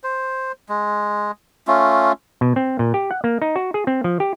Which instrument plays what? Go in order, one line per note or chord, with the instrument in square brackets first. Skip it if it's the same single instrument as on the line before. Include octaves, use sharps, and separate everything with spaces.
[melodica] C5
G#3
A3 C#4 F4
[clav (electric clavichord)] B2
C4
A#2
G4
F#5
A#3
D#4
F#4
G#4
C4
F3
G4